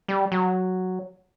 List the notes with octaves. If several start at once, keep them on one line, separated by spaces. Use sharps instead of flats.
G3
F#3